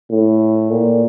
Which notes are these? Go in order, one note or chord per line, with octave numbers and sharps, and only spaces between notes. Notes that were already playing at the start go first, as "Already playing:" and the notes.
A2
A#2